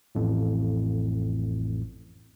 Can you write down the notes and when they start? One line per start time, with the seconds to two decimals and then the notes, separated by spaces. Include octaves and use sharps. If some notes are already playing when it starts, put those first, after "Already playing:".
0.15 A1 F2 A2